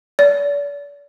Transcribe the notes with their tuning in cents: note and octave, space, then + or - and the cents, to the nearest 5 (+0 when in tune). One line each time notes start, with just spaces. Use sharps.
D5 -40